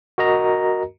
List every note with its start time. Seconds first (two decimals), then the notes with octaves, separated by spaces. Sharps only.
0.18 F#4 A#4 D#5 A#5